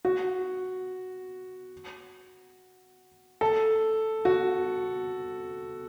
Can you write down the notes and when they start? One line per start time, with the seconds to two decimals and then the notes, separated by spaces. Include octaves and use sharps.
0.05 F#4
3.41 A4
4.25 F#4